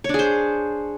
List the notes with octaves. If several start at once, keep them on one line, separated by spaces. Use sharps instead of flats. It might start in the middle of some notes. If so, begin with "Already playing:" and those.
D4 G#4 C5 C#5